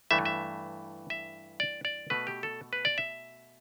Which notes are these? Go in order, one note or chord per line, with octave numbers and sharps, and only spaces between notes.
G2 E3 A3 E5
E5
E5
D5
D5
B2 A3 B4
G4
A4
B4
D5
E5